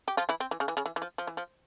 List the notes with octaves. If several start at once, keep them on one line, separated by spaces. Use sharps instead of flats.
G4
F3 F4
E3 E4
C4
E3
C#3
E3
C#3
E3
E3
F3
F3
E3
F3